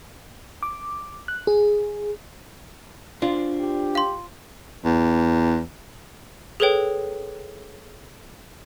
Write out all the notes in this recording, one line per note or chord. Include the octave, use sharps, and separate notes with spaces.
D6
F#6
G#4
D4 F4 C5
G4
F5 C6
E2
G#4 A4 B4 C#5 G5